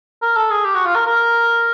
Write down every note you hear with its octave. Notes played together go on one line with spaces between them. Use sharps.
A#4
A4
G#4
G4
F#4
F4
A#4
A#4